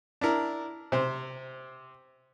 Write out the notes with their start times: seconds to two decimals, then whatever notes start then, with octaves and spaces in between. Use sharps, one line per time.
0.21 D4 E4 A#4
0.92 C3 C5